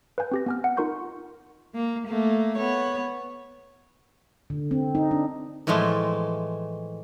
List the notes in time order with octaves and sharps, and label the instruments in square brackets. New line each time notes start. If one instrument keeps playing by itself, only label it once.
[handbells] B4 F5 G#5 G6
C4 G4 A#6
B3 G#5 F6
F#5
D#4 F4 A#4 C6 C#6 G6
[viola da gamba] A#3
A3 A#3
B3 C#5
[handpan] D3
C4
D#4
D4
[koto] A2 E3 F3 G#3 A3